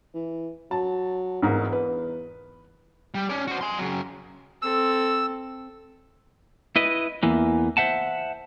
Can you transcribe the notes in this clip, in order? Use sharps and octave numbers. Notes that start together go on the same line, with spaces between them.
E3
F#3 A5
G#1 E2 G#2 A#4
B4
G3
C#4 D5
F#4 C5
G#5 C6
C#3 F#3
C4 A4 E6
E4 B4 D#5
E2 E3 A#3
C5 E5 F#5 A5